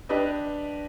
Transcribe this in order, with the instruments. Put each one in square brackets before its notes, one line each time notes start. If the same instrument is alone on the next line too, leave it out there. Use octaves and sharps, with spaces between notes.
[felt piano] D4 G4 B4 D#5